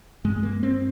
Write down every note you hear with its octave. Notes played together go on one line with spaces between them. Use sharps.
G2 G#3
A#3
C4